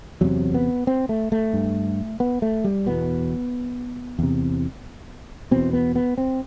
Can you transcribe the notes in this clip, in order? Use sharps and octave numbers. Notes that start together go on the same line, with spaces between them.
E2 C3 F#3
B3
C4
A3
A3
G2
B3
A3
G3
E2 B2 B3
E2 C3
E2 B2 C4
B3
B3
C4